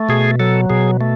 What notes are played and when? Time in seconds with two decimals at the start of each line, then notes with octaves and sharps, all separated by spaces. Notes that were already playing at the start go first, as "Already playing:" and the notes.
Already playing: A3
0.09 B2 G#4
0.40 F#3 A4
0.70 B2 G#4
1.01 A3